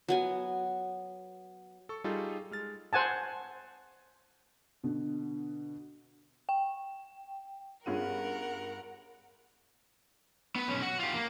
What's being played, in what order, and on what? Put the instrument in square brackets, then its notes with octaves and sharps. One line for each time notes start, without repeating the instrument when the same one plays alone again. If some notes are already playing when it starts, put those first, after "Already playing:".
[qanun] F#3 B3 G#5
[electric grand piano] A4 C#6
G3 D#4 F4 G#4 A4
G#3 F6 A6
[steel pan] C5 F#5 G#5 A5
[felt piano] B2 D3
[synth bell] G5
[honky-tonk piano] G2 F4 D#7 [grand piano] B3 C#4 G#4 [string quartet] A#4 F#5
[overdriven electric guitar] B3 B4
B1 C#4
F#4 F#5
F4 G4
A#3